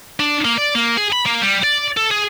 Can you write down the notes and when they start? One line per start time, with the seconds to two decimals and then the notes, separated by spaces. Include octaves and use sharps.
0.20 D4
0.45 A#3
0.58 D5
0.75 A#3
0.97 G#4
1.12 B5
1.26 A#3
1.42 G3
1.64 D5
1.97 A4
2.11 G#4